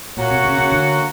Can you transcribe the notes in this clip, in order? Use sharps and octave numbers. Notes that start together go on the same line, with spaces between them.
A#2 F#3 A#3 C#4 F#4
C3
C#3
C#3
D3